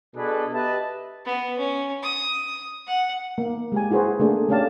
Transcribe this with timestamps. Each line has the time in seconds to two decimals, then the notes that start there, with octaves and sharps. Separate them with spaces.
0.15 B2 D4 G#4 A4 B4
0.52 G4 B4 D#5 E5 A5
1.25 B3
1.58 C#4
2.02 D#6
2.87 F#5
3.38 A#3
3.72 G#3 G4 G#5
3.91 E4 F#4 G#4 B4 C5
4.20 A3 A#3 D4 G#4
4.49 A3 C#4 G4 D5 F5 A5